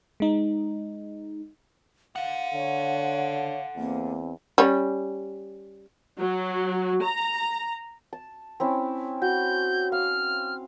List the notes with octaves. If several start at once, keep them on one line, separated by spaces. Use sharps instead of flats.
G#3 D#4
A4 F5 F#5
D3 C#5
E2 A#3 C4
G3 C#4
F#3
A#5
A5
C4 C#4 E4
F#4 G6
F5 F6